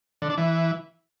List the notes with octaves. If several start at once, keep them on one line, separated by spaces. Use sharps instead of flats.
D3
D4
E3